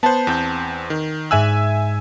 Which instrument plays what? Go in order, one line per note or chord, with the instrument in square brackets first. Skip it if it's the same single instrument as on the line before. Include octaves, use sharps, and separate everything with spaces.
[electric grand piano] B3 C5 [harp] F#5 A5
[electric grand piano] E2 C4 G6
D#3
[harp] G#2 F#6 [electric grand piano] E5 G#5 E6